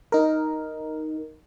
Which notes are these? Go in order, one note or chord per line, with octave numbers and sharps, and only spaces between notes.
D#4 A#4